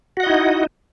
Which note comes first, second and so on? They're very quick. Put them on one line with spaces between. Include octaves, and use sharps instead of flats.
F#4 F#5 D#5 E4 D#4